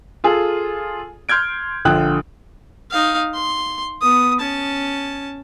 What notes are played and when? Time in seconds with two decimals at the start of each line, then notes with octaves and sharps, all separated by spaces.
0.24 F4 G#4 A4
1.29 C6 F6 G6 G#6 D7
1.85 A#1 D3 F4 G5 D#6 F#6
2.91 D#4 F5
3.34 C6
4.01 B3 D#6
4.40 C#4 A5